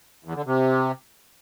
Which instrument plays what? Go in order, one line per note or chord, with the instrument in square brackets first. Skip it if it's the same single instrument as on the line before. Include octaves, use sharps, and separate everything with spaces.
[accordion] E2
D3
C3